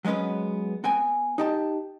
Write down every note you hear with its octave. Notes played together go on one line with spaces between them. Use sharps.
F#3 G#3 B3 C#4 B4
B3 G5 G#5
D#4 G4 A5